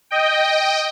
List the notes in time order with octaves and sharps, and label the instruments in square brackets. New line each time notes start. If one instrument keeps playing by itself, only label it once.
[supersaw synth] D#5 G5